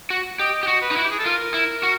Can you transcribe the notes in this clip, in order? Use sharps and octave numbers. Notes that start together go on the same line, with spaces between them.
F#4
G4 D#5
G4
F#4
B4
D#4
E4 F#4
G4
G#4
A4
F4 A#4
E4
F#4